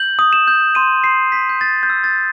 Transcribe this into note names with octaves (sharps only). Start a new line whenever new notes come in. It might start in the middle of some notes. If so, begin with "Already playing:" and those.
Already playing: G6 F#7
D#6
E7
G6
C6 D#7
C6 C7
G6 B6
G6
C6 A6
G6
E6
A6